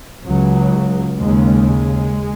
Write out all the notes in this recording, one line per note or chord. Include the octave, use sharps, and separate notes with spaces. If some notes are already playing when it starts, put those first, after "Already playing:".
C#2 C#3 F#3
D#2 C#3 G#3
G#3